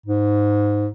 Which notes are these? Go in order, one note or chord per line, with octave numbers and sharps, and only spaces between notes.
G#2